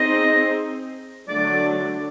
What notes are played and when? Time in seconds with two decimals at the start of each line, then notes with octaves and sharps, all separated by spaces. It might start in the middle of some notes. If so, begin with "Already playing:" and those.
Already playing: C4 D#4 G#4 C5 D#5
1.28 D3 F#3 A3 D4 D5